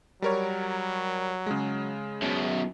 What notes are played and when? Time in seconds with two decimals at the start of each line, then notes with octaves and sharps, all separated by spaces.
0.22 F#3 G3 A#4 C#5
1.46 C#3 G#3
2.22 F#2 B2